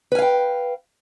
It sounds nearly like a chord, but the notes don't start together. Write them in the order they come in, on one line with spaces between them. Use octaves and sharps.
B4 G#5 F5 G5